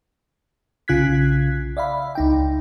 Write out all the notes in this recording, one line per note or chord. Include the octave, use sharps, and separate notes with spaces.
B1 C#3 F4 F#6 G#6 B6
D5 E5 F5 B5
C#2 D#4 G5